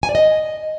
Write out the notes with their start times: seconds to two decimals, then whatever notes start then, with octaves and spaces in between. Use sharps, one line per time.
0.03 G#5
0.09 D5
0.15 D#5